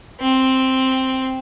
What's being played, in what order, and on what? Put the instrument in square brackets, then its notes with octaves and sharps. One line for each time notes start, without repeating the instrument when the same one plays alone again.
[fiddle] C4